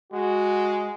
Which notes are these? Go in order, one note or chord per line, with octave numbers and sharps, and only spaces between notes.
G#3 F#4